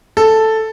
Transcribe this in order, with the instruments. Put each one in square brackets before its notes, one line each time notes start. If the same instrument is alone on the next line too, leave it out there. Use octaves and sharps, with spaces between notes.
[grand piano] A4